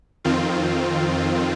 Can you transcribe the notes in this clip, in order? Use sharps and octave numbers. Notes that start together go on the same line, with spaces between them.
F2 D#3 C4 F4